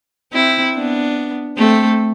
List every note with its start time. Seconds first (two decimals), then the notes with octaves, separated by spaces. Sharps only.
0.33 C4 E4
0.74 B3 D4
1.58 A3 C4